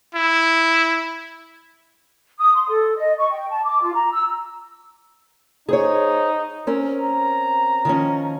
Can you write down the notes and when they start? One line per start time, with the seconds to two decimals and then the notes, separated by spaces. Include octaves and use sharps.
0.15 E4
2.38 D#6
2.54 C6
2.68 A4
2.95 D#5
3.18 C#6
3.31 G5
3.50 A5
3.64 D6
3.81 F4
3.93 A#5
4.10 E6
5.69 D#4 G#4 C5 C#5
6.67 C4 C#4 A#4
7.02 A#5
7.85 D#3 F3 C#4